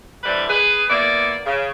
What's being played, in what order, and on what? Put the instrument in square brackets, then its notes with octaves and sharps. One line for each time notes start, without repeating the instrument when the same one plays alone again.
[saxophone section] D3 E3 G3 C4 B4
G#4 B4
A#3 B3 E4 D5
C#3